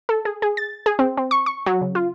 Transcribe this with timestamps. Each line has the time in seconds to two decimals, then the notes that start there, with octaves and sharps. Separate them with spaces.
0.09 A4
0.25 G#4
0.42 G#4
0.57 A6
0.86 G#4
0.99 C4
1.18 C4
1.31 C#6
1.46 C#6
1.66 F#3
1.81 C#3
1.95 F4